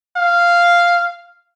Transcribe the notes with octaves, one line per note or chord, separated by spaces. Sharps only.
F5